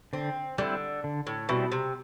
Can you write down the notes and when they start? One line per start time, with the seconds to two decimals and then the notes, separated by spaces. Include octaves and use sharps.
0.13 D3 C4
0.58 D3 G3 C4 E4
1.04 D3
1.27 A2
1.49 B2 G3 C4 E4
1.72 C3